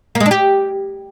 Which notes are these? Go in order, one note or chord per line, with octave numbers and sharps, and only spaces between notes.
A#3
G#3
D4
G4